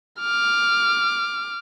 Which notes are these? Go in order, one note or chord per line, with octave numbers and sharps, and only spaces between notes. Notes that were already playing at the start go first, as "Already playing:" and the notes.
D6 F6